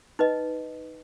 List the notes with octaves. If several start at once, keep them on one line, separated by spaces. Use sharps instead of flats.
D#4 B4 D#5